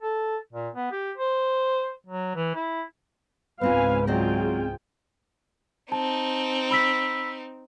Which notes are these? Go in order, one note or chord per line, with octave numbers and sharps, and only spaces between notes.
A4
A#2
B3
G4
C5
F#3
E3
E4
C#2 G#2 B3 C4 F4 B4 F5 G#5
F#3 C4 F4 G#4 D5 D#5 G5
C4 D#4 A5
B5 E6 B6